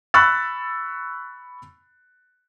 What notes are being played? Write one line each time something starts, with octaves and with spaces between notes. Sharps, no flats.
B5 C#6 E6 F#6 A6